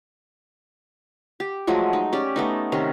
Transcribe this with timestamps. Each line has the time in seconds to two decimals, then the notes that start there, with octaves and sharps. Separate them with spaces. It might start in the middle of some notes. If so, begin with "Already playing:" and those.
1.40 G4
1.67 F3 F#3 G#3 A3
1.93 D#4
2.13 C#4 G4 D5
2.36 A3 B3 D#4
2.72 C3 D#3 C#4